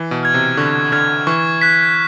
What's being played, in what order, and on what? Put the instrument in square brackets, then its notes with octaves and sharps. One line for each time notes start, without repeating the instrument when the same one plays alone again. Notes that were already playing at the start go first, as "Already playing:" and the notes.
Already playing: [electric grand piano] E3
B2
[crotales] F6 G#6
[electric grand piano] C3
[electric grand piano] D3 [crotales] C#6
[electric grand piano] D3 [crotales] F6 G#6
[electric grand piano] E3 [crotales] C#6
[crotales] F#6 B6